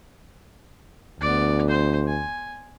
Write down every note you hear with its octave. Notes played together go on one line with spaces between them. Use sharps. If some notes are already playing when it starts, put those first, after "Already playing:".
D2 B3 D5
C5
G#5